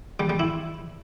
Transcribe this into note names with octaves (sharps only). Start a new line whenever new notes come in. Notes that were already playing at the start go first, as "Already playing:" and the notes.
G3
G3
E4